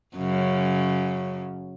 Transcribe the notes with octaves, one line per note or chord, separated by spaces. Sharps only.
F#2 C#3